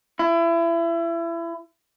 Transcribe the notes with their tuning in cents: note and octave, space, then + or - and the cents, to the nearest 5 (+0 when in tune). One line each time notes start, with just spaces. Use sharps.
E4 +30